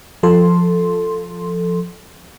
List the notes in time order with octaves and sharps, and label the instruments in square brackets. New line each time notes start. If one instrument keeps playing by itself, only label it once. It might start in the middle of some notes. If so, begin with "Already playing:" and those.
[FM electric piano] F3 A4 C6